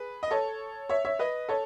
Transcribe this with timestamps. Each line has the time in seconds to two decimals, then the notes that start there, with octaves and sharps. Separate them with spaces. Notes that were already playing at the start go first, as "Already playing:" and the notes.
Already playing: G#4 B4
0.23 D#5
0.31 A4 C#5
0.89 C#5 E5
1.05 C#5 E5
1.19 B4 D#5
1.49 A4 C#5